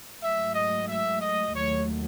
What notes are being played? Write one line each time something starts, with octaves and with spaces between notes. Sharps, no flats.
G#2 F#3 A3 E5
D#5
E5
D#5
D#2 D#3 F#3 A3 C#5